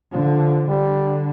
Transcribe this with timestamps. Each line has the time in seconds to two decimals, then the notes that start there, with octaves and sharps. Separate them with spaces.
0.13 D3 F3
0.68 D3 G3